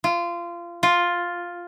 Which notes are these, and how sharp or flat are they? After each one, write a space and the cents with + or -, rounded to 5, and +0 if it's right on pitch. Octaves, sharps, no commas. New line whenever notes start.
F4 -20
F4 +5